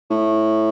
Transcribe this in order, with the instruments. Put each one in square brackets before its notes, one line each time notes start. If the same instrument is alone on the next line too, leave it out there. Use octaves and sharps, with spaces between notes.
[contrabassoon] A2